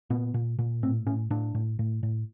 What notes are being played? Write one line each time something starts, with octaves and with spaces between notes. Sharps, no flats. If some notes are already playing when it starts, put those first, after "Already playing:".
A#2 B3
A#2
A#2
A2 C4
A2 C#4
A2 D4
A2
A2
A2